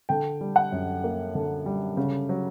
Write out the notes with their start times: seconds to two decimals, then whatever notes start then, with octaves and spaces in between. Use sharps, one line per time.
0.09 D3 G5
0.41 G3
0.56 F#5
0.72 F#2
1.04 A#3
1.35 D3
1.66 G3
1.97 C#3
2.29 F#3